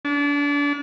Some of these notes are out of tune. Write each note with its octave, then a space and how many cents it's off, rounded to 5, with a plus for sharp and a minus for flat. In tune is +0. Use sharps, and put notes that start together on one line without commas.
D4 -30